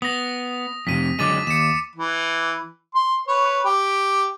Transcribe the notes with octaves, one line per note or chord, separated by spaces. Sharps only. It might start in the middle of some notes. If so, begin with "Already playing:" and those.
B3 D#6 A#6
F2 A2 C3 B6 D#7
D3 F#3 G#3 D6 A6 D#7
D#2 C#7 E7
E3
C6
B4 C#5
G4